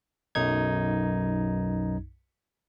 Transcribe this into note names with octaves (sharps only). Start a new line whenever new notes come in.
B1 F#2 D#4 G#6